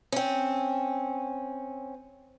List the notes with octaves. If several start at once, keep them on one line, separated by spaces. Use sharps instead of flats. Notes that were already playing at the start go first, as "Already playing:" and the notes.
C4 C#4